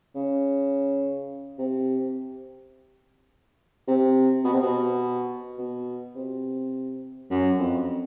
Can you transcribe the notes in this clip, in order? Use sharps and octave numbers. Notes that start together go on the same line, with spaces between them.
C#3
C3
C3
B2
C3
B2
B2
C3
F#2
F2